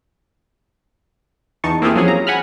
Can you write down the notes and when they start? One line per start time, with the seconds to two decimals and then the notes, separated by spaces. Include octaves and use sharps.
1.64 E2 D#4 A5 C#6
1.82 A#3 C4 E4 F4 G4 G#4
1.95 F3 F#3 C#4 G#4
2.08 A#5
2.27 F#5 G#5 B5 F6